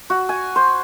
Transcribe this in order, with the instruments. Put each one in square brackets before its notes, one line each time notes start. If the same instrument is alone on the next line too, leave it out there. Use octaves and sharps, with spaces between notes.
[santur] F#4
G#5
C5